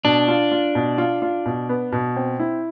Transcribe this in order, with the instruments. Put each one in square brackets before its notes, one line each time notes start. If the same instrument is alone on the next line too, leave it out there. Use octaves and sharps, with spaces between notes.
[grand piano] B2 [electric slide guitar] D4
[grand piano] F4
F4
B2
F4
F4
B2
B3
B2
C4
E4